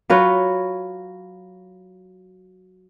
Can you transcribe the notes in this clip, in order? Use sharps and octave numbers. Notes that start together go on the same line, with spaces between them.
F#3 F4 B4 C#5